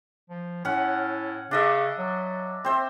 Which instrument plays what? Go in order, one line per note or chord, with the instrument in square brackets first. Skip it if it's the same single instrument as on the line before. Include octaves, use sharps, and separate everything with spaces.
[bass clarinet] F3
[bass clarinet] A2 [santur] C#4 F#5
[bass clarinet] C#3 [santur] D4 D#5 E5
[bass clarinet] F#3
[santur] C4 C5 E5